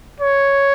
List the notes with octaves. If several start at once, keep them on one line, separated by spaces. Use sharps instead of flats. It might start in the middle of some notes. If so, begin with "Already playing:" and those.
C#5